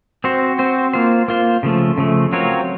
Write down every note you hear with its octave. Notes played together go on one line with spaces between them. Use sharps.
C4 F#4 C5
C4 F#4 C5
A#3 F4 C5
A#3 F4 C5
C#3 F3 A3
C#3 F3 A3
F#3 C4 F4 A#4 C#5